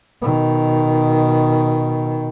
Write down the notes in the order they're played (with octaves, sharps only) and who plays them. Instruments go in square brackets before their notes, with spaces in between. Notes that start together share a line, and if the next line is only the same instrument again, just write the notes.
[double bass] B2 D#3